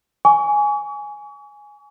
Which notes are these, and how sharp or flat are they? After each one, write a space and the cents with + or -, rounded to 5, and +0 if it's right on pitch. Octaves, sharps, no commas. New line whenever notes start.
G#5 +0 C#6 +40